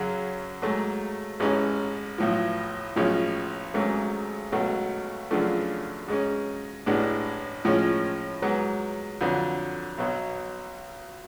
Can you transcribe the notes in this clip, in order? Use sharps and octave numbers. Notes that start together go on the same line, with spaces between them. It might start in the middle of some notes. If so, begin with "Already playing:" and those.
Already playing: F#2 C#3 F#3
G#2 F#3 A3
A1 G#2 G#3 C#4
B1 A2 F3
B1 A2 F3 G#3 C#4
G#1 G#2 F#3 A3 C#4
C#2 B2 F#3 A3
F#2 C#3 F3 A3 D4
G#2 G#3 C#4
A1 A2 G#3 B3 D4
A2 F3 G#3 C#4
G#2 F#3 B3
F2 D3 F#3
B1 B2 F#3